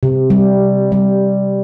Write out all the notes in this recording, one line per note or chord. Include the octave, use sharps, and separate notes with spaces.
C3
G3
G3